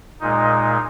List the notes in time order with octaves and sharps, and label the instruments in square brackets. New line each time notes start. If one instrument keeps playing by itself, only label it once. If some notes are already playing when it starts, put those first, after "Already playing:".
[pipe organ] A#2 G#3 D#4